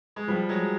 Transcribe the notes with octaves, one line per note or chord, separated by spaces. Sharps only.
G#3
F3 G3
F#3 G#3